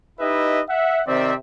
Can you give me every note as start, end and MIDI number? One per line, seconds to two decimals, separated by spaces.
0.20 0.61 63
0.20 0.61 64
0.20 0.61 67
0.20 0.61 71
0.20 0.61 75
0.20 0.61 76
0.69 1.01 76
0.69 1.01 78
1.07 1.34 48
1.07 1.34 51
1.07 1.34 60
1.07 1.34 74
1.07 1.34 76